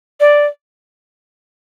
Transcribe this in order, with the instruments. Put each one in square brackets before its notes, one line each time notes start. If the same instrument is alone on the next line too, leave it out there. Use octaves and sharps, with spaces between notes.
[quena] D5